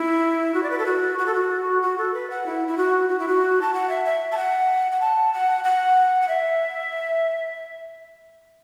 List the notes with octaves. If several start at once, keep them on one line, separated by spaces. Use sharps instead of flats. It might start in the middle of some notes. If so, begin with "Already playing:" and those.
Already playing: E4
F#4
D5
B4
A4
F#4
F#4
A4
F#4
F#4
A4
B4
F#5
E4
E4
F#4
F#4
E4
F#4
A5
F#5
E5
E5
A5
F#5
F#5
A5
F#5
F#5
F#5
E5